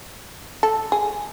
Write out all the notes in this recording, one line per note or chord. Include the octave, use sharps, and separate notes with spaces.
A4
G#4